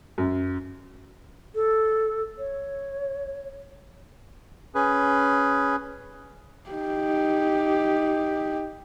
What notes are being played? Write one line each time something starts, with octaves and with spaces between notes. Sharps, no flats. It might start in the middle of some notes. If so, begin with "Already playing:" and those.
F#2
A4
C#5
C#4 G#4 B4
D#4 G4